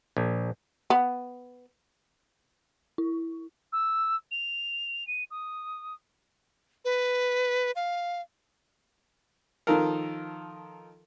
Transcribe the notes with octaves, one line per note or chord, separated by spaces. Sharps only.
A#1
B3
E4
E6
F7
D#7
D#6
B4
F5
D#3 F3 F4 A4 A#4